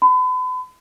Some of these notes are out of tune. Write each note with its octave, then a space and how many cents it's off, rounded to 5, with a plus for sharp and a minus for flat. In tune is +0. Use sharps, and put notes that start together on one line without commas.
B5 +40